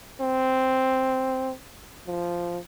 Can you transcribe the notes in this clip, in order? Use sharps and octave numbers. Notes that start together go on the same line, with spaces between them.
C4
F3